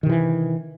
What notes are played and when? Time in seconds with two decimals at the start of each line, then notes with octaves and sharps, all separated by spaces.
0.03 D#3
0.06 C3
0.09 E3